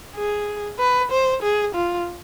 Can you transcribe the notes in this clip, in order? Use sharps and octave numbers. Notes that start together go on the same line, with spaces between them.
G#4
B4
C5
G#4
F4